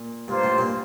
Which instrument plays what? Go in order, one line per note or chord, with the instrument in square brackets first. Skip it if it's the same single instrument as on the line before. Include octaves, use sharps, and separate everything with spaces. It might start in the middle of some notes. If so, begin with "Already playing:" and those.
Already playing: [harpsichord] A#2
[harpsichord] G2 [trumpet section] A#3 F4 C5
[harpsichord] A2
G2 A#2